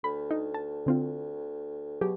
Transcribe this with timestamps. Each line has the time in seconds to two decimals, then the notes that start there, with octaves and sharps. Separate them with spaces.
0.04 D2 B5
0.31 D#4
0.54 A5
0.86 D3 C4 F4
2.01 B2 F#3 G4 G#4